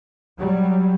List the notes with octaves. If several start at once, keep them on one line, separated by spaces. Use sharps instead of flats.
F#3 G3